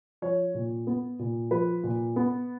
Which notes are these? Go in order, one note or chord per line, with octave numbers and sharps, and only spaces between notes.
F3 C#5
A#2
B3
A#2
F3 B4
A#2
B3